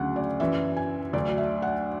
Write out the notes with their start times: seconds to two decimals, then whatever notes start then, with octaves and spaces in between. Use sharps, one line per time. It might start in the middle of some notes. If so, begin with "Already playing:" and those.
Already playing: D2 C#3 F#3 F#5
0.16 D5
0.40 F#2 E3 E5
0.77 G#5
1.13 D2 D3 F#3 D5
1.38 E5
1.62 F#5